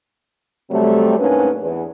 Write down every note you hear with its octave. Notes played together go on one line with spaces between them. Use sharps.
C3 F#3 G3 A3
G#2 A#3 C#4 D4 B4
E2